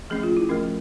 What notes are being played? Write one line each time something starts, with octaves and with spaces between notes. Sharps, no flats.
F3 A3 C#4 G#4
F4
E4
F3 A3 C#4 A#4